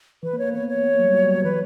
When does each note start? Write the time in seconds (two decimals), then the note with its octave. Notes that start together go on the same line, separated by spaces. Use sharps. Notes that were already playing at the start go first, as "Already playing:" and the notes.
0.23 E3 B4
0.33 A#3
0.39 C#5
0.44 A#3
0.53 B3 C#5
0.69 C#5
0.84 B3
0.95 A#3
1.00 F#3
1.04 G3
1.14 F#3
1.24 G3
1.35 F#3
1.44 E3 B4